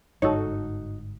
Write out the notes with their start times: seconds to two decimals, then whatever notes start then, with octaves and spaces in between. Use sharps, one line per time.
0.22 G1 G#2 D#4 F#4 A4 C#5